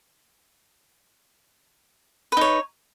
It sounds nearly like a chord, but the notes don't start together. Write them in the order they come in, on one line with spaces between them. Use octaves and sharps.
B4 D#4 C#5